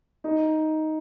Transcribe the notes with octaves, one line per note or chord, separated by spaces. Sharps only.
D#4